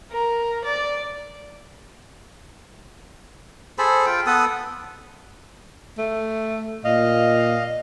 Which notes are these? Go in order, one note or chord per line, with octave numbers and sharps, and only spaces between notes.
A#4
D5
G#4 A4 C5 B5
F4 G5
B3 A4 B4 D#6
A3
A#2 D#5 F5